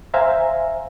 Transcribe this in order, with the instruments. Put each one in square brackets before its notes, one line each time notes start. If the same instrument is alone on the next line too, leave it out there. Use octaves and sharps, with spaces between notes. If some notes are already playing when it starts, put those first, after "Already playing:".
[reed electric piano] C5 E5 F5 G#5 A#5